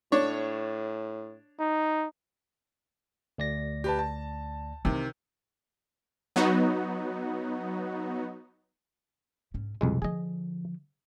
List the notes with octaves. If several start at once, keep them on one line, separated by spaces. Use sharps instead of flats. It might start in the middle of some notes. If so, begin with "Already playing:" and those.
A2 D4 C#5
D#4
D2 D5 A#6
G4 B4 A5
A5
C3 D#3 E3 C4
F#3 B3 D#4 F#4
G#2 C#4
C2 F2 B2 G#3
D3 F3 G#4 D#5